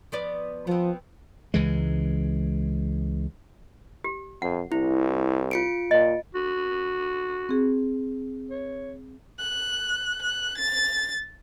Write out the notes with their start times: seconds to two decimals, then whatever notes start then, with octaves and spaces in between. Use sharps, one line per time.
0.12 F3 B3 D5
0.67 F3 B3 C4
1.54 C#2 E3 G#3
4.04 G4
4.42 F2 F#5
4.72 C2 E4
5.51 F4 C#7 D7
5.91 A#2 D#5
6.35 F#4
7.49 C4 G#4
8.51 C#5
9.40 F#6
10.22 F#6
10.58 A6